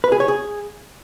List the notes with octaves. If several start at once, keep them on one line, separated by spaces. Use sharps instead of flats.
B4
G#4
C#5
G#4